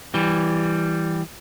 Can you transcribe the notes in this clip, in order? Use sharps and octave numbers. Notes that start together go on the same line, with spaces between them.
E3 G3